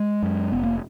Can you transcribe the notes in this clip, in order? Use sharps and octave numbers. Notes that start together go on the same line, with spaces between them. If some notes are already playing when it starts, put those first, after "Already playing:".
Already playing: G#3
F#2
F1 B3
A#3